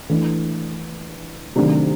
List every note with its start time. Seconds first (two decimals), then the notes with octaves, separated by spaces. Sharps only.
0.10 E3 A3 D4
1.56 C3 D#3 F#3 A3 D4